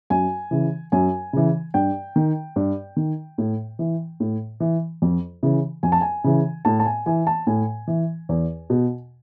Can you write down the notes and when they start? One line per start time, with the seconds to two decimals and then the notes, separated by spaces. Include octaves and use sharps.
0.10 F#2 G#5
0.51 C#3 E3
0.92 F#2 G#5
1.33 C#3 E3
1.74 G2 G5
2.16 D#3
2.56 G2
2.96 D#3
3.38 A2
3.79 E3
4.20 A2
4.60 E3
5.02 F2
5.43 C#3 E3
5.83 F2 G#5
5.92 A5
6.01 G#5
6.24 C#3 E3
6.65 A2 A5
6.80 A5
6.86 G#5
7.06 E3 G#5
7.27 A5
7.47 A2 G#5
7.87 E3
8.29 E2
8.70 B2